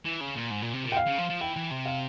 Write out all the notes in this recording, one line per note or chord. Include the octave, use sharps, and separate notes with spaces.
E3
C#3
A#2
G#2
A#2
C3
A#2
G5
F5
C#3
F3
F3
E3 G5
E3
C3
F5